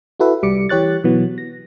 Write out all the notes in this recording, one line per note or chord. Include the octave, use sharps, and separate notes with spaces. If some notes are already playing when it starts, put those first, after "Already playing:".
E4 F#4 A4 B4 E5
C2 G3 D6 C#7
E3 G4 C#5 F#6 A6
B2 E3 F#3 B3
A#6